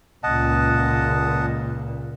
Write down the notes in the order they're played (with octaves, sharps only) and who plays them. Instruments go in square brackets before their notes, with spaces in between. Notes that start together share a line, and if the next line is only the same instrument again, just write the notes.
[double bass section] C#2 A#2 [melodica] D#5 F#5 A5